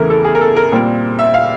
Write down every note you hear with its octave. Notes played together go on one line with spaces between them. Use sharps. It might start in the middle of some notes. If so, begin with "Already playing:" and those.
Already playing: E2 C#3 E3 A3 A#4
A4
G#4
A#4
A4
A#4
A#2 G3 C4
E5
F5